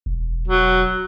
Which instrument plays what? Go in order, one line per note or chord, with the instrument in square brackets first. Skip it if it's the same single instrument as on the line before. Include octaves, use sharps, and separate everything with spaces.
[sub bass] E1
[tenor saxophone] F#3